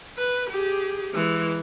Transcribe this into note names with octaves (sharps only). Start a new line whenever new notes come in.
B4
G4 G#4
E3 G#3